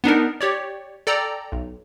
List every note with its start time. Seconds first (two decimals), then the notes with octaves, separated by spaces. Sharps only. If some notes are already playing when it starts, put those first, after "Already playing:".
0.04 B3 D4 D#4 A#4
0.41 G4 C#5 D5
1.07 A4 D5 G5 A#5
1.52 B1